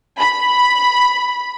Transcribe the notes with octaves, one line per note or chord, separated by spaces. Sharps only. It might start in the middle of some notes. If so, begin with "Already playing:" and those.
B5